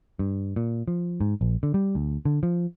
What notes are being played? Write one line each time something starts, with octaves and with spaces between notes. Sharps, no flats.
G2
A#2
F3
G#2
A#1
D3
G3
D2
D3
F3